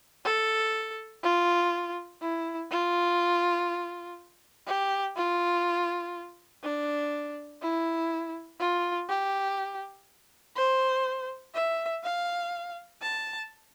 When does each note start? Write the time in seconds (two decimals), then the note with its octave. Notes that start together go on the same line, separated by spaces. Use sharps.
0.25 A4
1.23 F4
2.22 E4
2.71 F4
4.67 G4
5.16 F4
6.63 D4
7.62 E4
8.60 F4
9.09 G4
10.56 C5
11.54 E5
12.04 F5
13.02 A5